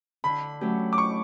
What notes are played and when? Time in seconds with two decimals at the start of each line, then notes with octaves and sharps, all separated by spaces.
0.24 D3 B5
0.61 F#3 A3 C#4 G4
0.93 D6
0.98 C#6